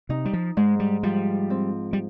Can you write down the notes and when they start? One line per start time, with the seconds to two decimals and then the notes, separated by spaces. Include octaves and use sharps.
0.09 C3 D#4
0.25 G3
0.33 F3
0.57 G#2 G#3
0.80 G3
1.03 F3 G3
1.50 C4
1.93 G3